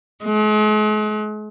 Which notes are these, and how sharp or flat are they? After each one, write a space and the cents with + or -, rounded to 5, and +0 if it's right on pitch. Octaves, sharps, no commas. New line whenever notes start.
G#3 +45